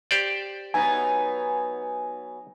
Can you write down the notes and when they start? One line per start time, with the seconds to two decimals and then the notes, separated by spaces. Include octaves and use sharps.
0.11 G4 C5 D5
0.74 F#3 B3 D#4 G#5